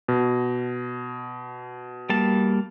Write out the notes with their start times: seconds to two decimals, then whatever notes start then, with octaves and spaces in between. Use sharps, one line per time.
0.08 B2
2.09 G3 A#3 A5